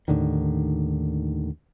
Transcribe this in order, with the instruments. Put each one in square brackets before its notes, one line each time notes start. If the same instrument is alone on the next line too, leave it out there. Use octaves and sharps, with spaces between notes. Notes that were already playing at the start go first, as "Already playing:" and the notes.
[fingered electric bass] D#2 A2 D3 D#3